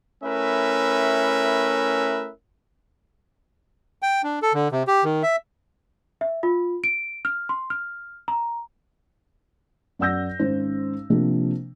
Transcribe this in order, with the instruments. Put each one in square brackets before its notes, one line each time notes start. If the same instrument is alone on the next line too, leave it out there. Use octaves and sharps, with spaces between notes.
[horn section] A3 C#4 E4 A#4 B4 E5
[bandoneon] G5
D4
A4
D3
C3
G4
D#3
E5
[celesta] E5
F4
D7
F6
C6
F6
A#5
[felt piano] F#2 D5 F#5 E6 G6 A#6
G#1 C#4 C5
C3 F3 A#3 D4